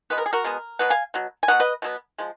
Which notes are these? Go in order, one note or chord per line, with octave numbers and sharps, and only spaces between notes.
B2 G#3 B3 B4
A#4
G#4
F#4 A#4
B2 G#3 B3
B2 F#3 B3 B4
F5 G#5
B2 F#3
G#5
B2 F#3 B3 F#5
B4 D#5
B2 F#3 B3
F3 G#3